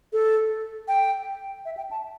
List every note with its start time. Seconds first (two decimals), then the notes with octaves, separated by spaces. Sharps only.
0.13 A4
0.88 G5
1.65 E5
1.77 G5
1.91 A5